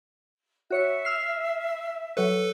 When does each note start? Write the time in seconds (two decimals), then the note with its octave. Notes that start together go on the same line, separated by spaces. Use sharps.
0.70 F#4 C#5 E5 C#7
1.05 E6 F6 C7
2.17 F#3 A4 B4 C#5